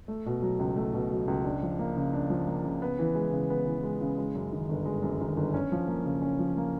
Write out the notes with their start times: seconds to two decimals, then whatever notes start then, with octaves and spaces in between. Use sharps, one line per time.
0.08 A3
0.26 B2
0.42 F#3
0.59 C#2
0.76 A3
0.93 B2
1.12 F#3
1.27 C#2
1.44 D4
1.63 F3
1.79 A#3
1.97 C#3
2.13 D4
2.30 F3
2.48 A#3
2.64 C#3
2.82 B3
2.99 E3
3.15 G#3
3.32 C#3
3.50 B3
3.66 E3
3.83 G#3
4.01 C#3
4.18 G#3
4.35 F#2
4.52 D#3
4.69 G1
4.85 G#3
5.03 F#2
5.21 D#3
5.37 G1
5.54 C#4
5.72 F3
5.88 A#3
6.05 C#3
6.22 C#4
6.39 F3
6.57 A#3